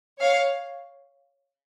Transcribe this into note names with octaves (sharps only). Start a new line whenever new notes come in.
C#5 F5